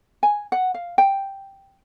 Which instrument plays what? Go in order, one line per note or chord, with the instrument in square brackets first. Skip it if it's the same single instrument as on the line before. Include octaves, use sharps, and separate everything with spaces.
[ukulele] G#5
F#5
F5
G5